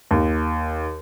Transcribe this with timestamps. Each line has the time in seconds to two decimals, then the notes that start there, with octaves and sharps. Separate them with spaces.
0.11 D#2